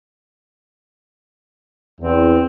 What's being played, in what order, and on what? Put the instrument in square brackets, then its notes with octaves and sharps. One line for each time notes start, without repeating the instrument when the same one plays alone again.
[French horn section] E2 [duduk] C4